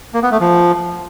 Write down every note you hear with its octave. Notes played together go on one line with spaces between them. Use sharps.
A#3
B3
A3
F3